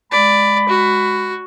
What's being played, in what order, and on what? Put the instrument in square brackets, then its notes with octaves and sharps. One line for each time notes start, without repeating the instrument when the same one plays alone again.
[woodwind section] G#3 B5 [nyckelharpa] D5
[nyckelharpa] F#4